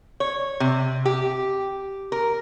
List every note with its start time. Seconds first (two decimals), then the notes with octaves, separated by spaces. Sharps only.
0.20 C#5
0.60 C3
1.06 G4
2.12 A#4